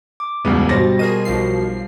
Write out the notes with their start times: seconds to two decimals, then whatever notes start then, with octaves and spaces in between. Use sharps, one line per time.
0.20 D6
0.45 E1 C#2 A2 C#3 G3 B3
0.69 G2 B2 G3 C5 A6 A#6
0.99 G#4 A#4 D#5 D#7
1.25 B1 F3 C7